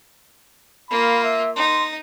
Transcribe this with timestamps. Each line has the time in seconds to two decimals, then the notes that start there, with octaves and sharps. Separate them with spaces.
0.90 A#3 F4 B5
1.23 E5
1.56 D#4 C6